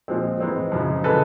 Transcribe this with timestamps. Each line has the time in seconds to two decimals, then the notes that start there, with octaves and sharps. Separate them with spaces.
0.08 A#2 F3 G#3 C4
0.40 G#2 E3 G#3 C4
0.72 F#2 C#3 F3 G#3
1.04 C#3 E3 G#3 A4 B4